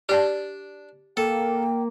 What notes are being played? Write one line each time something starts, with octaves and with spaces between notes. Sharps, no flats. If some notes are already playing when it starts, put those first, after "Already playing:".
D4 G4 D5 A5
A#3 A4 G5